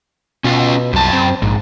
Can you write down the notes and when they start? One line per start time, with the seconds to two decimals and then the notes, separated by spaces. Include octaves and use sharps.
0.44 B2 C#4 F4 F5
0.93 C2 F#2 A5
1.13 C4
1.42 A#1 G#2